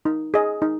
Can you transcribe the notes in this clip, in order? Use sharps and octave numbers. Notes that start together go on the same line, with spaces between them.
D#4
G#4 D#5
D#4